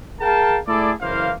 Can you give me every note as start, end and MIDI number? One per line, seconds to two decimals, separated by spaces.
0.21 0.58 68
0.21 0.58 70
0.21 0.58 77
0.21 0.58 79
0.21 0.58 81
0.68 0.93 57
0.68 0.93 64
0.68 0.93 68
0.68 0.93 69
0.68 0.93 74
1.01 1.33 30
1.01 1.33 52
1.01 1.33 58
1.01 1.33 72
1.01 1.33 77